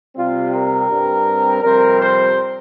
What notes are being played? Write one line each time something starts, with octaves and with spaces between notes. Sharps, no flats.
C3 G3 C4 F4
A#4
G2 G3 C4
F2 C3 G3 C4 A#4
C5